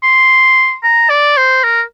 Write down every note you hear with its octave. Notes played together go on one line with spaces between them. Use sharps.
C6
A#5
D5
C5
A#4